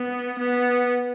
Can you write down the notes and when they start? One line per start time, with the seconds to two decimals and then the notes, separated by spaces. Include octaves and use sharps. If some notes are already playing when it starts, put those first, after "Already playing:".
Already playing: B3
0.39 B3